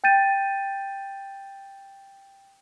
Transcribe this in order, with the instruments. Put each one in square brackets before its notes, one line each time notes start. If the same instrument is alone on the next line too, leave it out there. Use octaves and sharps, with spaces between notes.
[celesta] G5 G6 A6 D#7